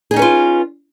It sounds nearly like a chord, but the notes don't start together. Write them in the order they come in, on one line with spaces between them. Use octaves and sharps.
G#4 D#4 C#4 B4 F4